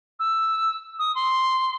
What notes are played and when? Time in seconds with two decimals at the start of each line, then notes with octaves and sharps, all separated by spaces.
0.19 E6
0.99 D#6
1.15 C6